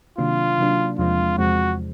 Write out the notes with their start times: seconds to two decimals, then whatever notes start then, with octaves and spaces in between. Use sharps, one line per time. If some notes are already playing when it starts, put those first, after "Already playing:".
0.18 C3 D#3 F#3 A#3 D4 F4
0.58 C3 D#3 F#3 A#3 D4
0.98 E2 C3 F3 G#3 C4 F4
1.38 E2 C3 F3 G#3 C4 F#4